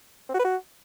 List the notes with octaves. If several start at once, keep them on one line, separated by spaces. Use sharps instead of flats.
C4
F#4
B4
F#4